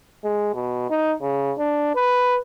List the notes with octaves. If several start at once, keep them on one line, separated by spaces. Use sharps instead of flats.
G#3
B2
D#4
C#3
D4
B4